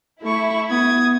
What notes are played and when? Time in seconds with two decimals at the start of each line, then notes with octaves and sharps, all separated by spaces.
0.23 A3 E4 C#6
0.71 B3 D#6 G#6